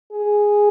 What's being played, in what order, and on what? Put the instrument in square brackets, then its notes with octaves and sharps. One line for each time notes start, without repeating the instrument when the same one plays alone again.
[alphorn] G#4